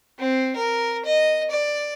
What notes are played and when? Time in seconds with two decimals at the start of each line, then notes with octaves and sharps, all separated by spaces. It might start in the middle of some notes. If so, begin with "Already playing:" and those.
0.19 C4
0.56 A#4
1.05 D#5
1.51 D5